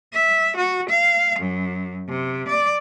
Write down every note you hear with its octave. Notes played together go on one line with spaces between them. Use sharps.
E5
F#4
F5
F#2
C3
D5